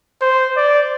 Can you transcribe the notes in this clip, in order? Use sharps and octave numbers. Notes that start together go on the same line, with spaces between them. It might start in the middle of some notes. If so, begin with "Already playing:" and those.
C5
D5